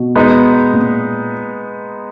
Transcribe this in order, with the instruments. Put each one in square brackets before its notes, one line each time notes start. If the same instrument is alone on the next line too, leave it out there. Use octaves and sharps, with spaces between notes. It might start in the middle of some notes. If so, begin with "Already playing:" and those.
Already playing: [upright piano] B2
[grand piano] G#3 B3 D#4
[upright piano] A#2